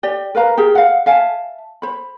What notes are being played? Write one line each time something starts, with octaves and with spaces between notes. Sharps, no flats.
G4 D5
A#4 B4 F5 A#5
G4 G#4 A#4
F5 F#5
E5 F5 G#5 A5
C5 B5